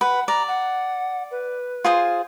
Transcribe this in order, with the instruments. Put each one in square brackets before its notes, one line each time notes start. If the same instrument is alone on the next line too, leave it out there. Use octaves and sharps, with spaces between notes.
[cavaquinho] B4 [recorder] F#5
[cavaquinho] D5 [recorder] A#5
[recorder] F#5
B4
[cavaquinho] F4 G#4 C5